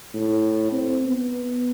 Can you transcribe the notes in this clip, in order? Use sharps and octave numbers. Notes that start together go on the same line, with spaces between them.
A2
C4
B3